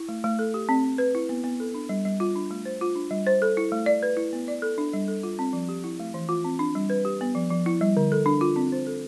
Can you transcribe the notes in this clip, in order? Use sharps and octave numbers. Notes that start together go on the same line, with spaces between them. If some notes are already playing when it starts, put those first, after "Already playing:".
Already playing: E4
A3
A3
A4
G4
C4
C4
B4
E4
B3
B3
A4
D4
G3
G3
F4
D4
A3
C5
F4
D4
G3
C5
A4
E4
A3
D5
B4
E4
B3
D5
A4
D4
G3
A4
F4
C4
F3
G4
E4
A3
E3
F4
C4
D4
G3
B4
G4
B3
F3
F3
E4
G3
D3
A4
D4
F4
C4
C5
A4